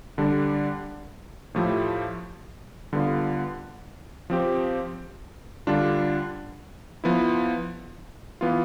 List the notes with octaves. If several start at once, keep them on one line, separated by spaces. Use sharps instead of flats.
D3 G3 D4
A2 F3 A3 E4 G4
D3 G3 B3 F4
F3 C4 G4
D3 G3 D4 F4
F3 B3 E4
E3 B3 F4